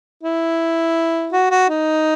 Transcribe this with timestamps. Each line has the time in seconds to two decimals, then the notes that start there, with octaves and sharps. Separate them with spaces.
0.23 E4
1.33 F#4
1.51 F#4
1.69 D#4